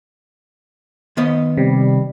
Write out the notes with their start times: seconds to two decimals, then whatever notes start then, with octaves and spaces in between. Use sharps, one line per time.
1.17 D#3 B3 D#5
1.57 C3 G3